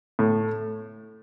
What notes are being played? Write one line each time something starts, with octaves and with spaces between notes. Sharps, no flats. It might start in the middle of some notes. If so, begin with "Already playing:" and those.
A2